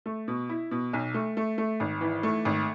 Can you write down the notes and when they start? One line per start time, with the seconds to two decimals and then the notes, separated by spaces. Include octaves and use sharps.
0.06 A3
0.28 B2
0.49 E4
0.71 B2
0.93 B1
1.14 A3
1.37 A3
1.58 A3
1.80 G#1
2.01 E3
2.23 A3
2.45 G#1